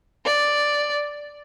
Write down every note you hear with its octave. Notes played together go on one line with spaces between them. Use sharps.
D5